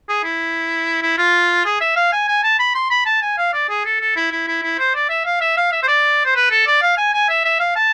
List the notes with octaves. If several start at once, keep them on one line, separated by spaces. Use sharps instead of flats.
G#4
E4
E4
F4
G#4
E5
F5
G#5
G#5
A5
B5
C6
B5
A5
G#5
F5
D5
G#4
A4
A4
E4
E4
E4
E4
C5
D5
E5
F5
E5
F5
E5
C5
D5
C5
B4
A4
D5
F5
G#5
G#5
E5
E5
F5
A5